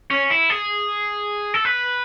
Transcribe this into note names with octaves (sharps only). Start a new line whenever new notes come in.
C#4
E4
G#4
A4
B4